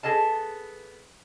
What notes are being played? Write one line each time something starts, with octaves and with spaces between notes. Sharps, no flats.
B3 G#4 A4 D#5 A5